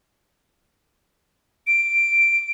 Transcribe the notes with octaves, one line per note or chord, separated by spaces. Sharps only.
D7